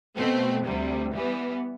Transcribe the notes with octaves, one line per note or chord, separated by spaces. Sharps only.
B2 A3 C4
D2 C3 G3
E3 G3 B3